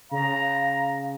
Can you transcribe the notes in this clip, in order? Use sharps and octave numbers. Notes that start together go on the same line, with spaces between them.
C#3 F5 A#5